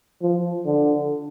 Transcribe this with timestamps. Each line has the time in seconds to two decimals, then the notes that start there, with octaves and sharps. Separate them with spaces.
0.21 F3
0.66 D3